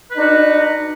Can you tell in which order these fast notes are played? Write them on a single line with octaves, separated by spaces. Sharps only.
B4 D#4 D#5 D4 F#4